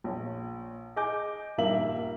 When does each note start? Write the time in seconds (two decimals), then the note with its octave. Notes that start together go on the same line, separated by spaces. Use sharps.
0.04 A#1 C#5
0.96 G#4 D#5 G#5 D6 G6
1.58 A#1 G2 D#3 A#3 E5 F#7